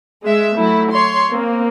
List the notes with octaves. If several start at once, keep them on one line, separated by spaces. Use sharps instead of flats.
G#3 E5
F#3 A3 E4
C#5 C6
A#3 C4